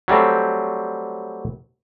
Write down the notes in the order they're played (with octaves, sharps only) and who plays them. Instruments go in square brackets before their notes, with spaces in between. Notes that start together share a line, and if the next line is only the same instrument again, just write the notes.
[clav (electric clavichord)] F#3 G3 A3 C4